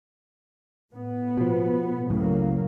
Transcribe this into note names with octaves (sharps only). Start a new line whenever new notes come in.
A2 B3
B2 F3
C#2 F#2 A2 C#3 F#3 A#3